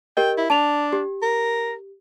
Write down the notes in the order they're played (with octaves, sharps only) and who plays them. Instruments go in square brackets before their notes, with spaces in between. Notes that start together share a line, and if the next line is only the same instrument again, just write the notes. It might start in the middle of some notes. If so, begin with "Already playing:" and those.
[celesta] G4 A#4 D#5 [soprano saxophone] G5
[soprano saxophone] E4
[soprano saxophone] D4 [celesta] A5 F7
[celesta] G4
[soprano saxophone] A#4